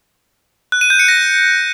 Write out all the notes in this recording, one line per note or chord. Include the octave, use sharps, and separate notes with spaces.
F#6
D#7
G6
C#7
A#6